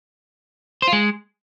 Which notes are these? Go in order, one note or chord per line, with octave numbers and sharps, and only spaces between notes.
C5
F4
G#3